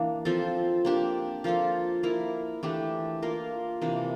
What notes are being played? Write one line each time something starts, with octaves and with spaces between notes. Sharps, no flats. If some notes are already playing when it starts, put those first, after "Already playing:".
Already playing: E3 A#3 D4
F3 C4 F4 A4
A#3 D4 G4
F3 A#3 F4 A4
A#3 E4 A#4
E3 A3 D4 G4
A#3 F4 A#4
C3 E3 A#3 D4